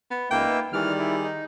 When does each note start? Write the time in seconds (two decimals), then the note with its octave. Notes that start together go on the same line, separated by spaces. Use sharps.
0.11 B3
0.31 C#2 A#3 D#4 B4 E5 G5
0.48 B3
0.73 D#3 E3 G3 G#4 D5 F6
0.99 E4
1.23 D#4